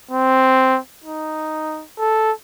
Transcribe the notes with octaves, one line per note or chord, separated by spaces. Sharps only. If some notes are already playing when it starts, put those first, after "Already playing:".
C4
D#4
A4